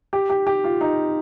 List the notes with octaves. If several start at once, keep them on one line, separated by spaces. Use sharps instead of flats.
G4
G4
G4
F4
D#4